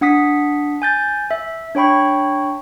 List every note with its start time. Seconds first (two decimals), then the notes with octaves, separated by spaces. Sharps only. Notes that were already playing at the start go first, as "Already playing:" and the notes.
0.01 D4 F#5 D#6 B6
0.82 G#5 G6 A6
1.31 E5
1.75 D4 C#5 G5 B5 C#6